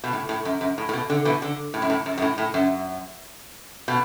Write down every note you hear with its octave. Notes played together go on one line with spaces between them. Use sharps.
B2
A2
A2
F#2
F#2
A2
A2
B2
D3
B2 E3
D3
A2
F#2
A2
F#2
F#2
A2
A2
F#2
B2